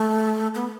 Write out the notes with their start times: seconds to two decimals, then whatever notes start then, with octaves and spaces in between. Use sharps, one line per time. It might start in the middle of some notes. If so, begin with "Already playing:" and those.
Already playing: A3
0.55 B3